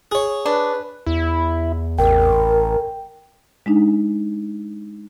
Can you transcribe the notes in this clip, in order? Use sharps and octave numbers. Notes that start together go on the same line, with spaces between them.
G#4 C#5
D4 B4
E2 E4
A1 A#4 G5
G#3 D4 D#4